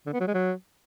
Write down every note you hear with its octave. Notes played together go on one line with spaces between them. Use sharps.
D3
B3
F#3
G#3
F#3